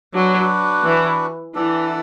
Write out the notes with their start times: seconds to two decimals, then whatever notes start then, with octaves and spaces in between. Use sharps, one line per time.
0.14 F#3 D4 F#4 B4
0.84 E3
1.55 E3 D4 A4 D5 F#5